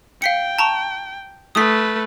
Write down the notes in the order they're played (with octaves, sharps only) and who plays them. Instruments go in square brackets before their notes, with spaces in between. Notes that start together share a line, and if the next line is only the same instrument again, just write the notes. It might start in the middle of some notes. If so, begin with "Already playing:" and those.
[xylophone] F5 B6 C#7 [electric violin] G5
[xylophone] A5 A#5 C#6
[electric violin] A3 B4 [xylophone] D#6 B6